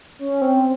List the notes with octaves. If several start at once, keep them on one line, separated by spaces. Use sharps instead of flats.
C#4
C4